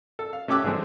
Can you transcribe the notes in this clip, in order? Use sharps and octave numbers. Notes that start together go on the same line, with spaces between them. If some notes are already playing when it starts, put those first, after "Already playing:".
A4
F5
A3 C#4 G4 D6 E6 F#6
D3 E3 G#3 A3 C4